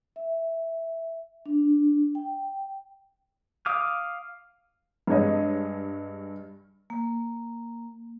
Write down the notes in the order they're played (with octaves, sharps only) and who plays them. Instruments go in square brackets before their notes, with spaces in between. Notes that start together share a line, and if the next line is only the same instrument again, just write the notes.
[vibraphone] E5
D4
G5
[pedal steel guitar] F5 D6 D#6 F6
[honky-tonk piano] G2 G#3 C#5 D#5
[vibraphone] A#3